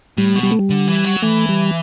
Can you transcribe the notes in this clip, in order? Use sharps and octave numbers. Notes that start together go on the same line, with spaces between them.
A2 G3
B2
G3
A3
G3
D3
E3
F#3
E3 A3
G3